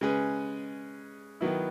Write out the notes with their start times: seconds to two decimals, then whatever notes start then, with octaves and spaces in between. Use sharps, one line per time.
0.01 C#3 G#3 C#4 G#4 B4
1.41 D#3 F#3 B3 E4